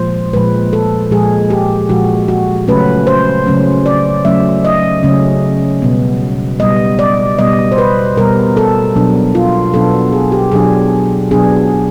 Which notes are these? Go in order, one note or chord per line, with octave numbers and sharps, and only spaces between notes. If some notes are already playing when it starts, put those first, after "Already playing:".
Already playing: A#2 F3 G#3 C5
A#2 F3 G#3 B4
A4
A#2 F3 G#3 G#4
G4
A#2 F3 G#3 F#4
F#4
C#3 F#3 A3 C#4 B4
C5
C#3 F#3 A3 C#4
D5
C#3 F#3 A3 C#4 E5
D#5
C#3 F#3 A3 C#4
B2 G3 B3
B2 G3 B3 D#5
D5
B2 G3 B3 D#5
C5
B4
B2 G3 B3 A#4
A4
B2 F#3 B3 D4
F4
B2 F#3 B3 D4 A4
G#4
G4
B2 F#3 B3 D4 G#4
B2 F#3 B3 D4 G#4